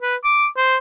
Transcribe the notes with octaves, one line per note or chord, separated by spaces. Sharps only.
B4
D6
C5